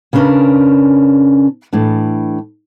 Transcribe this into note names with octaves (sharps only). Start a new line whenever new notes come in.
C#3 B3 C#4 D4 A#4 B4
A2 E3 D4